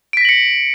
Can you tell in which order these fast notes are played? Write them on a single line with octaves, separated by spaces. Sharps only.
D7 B6 A#6 F#7 C#7